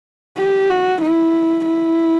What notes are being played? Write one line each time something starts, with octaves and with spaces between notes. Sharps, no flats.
G4
F#4
E4
E4